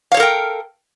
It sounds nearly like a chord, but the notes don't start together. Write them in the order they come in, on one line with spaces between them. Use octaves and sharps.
F5 C#5 A4 A#4 G5